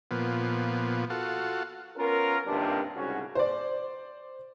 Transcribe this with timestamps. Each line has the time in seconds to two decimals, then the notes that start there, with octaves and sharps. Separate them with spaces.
0.11 A#2 F3 B3
1.10 F4 F#4 A4
1.97 B3 C#4 F4 A#4
2.46 G#1 C#2 G2 C3 A#3 D4
2.95 C2 G#2 C#3 C#4 F#4
3.35 C5 D5